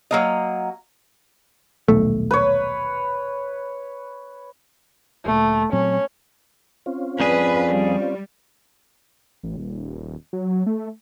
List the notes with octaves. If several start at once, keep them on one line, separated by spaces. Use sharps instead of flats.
F#3 A#3 D#5
D#1 B1 A3
B4 C#5
D1 A#2 A3
A#2 F#3 C4 C#4
C4 C#4 F4
F2 G#4 B4 D5
G3
A1
D#1
F#3
A3